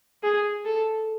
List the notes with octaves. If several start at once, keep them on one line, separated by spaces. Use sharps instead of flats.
G#4
A4